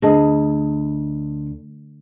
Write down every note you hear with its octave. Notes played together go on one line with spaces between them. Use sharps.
D2 D4 G#4 D#5